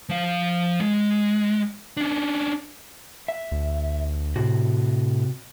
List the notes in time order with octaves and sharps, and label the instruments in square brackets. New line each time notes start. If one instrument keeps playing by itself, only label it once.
[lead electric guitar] F3 F5
G#3
C#4 D4
[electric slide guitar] E5
[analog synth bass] D2
[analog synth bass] A2 [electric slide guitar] C3 F#4